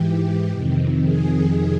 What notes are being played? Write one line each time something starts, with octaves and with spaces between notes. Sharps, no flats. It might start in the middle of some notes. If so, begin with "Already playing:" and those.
Already playing: G#2 E3 G4
F2 C3 D#3
G#4